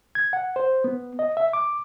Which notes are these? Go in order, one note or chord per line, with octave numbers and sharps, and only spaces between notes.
G#6
F#5
C5
B3
D#5
E5
D6